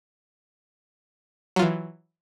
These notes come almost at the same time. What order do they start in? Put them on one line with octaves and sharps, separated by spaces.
F#3 F4 E3